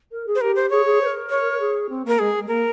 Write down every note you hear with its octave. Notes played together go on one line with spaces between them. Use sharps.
A#4
G#4
C5
G4 A#4
C5
G#4 C#5
G#4
C5
A#4
C#5
G#4
C4
A#3 A#4
G#3 G#4
G#3
A#3 A#4